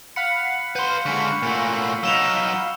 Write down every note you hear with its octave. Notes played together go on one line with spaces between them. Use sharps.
F5 F#5 B5 C#7
B4 C6 G6
D3 G#3 C#6
A#2 A3
F#3 D#4 E6 E7 F7